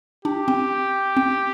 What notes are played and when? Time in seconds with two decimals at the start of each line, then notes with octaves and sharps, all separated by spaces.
0.25 D4 G4
0.48 C4
1.17 C4